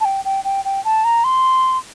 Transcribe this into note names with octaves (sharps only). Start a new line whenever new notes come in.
A5
G5
G5
G5
G5
A5
A#5
C6